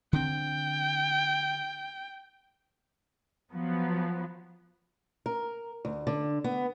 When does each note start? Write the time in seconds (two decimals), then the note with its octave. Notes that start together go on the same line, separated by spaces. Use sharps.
0.13 D3 C4 G5
3.51 F3 F#3 B3
5.26 A#4
5.85 D2
6.07 D3
6.44 B3